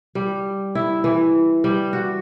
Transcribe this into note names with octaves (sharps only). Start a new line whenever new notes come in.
G3
E4
E3
G3
F#4